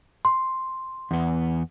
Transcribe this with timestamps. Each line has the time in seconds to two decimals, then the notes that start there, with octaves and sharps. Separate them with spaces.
0.25 C6
1.11 E2 B3